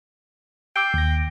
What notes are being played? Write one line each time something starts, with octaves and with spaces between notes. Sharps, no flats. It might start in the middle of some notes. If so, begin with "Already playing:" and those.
G5 D6 E6 C7
D#2 A#6